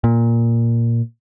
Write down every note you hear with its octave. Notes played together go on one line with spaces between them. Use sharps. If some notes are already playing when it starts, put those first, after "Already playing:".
A#2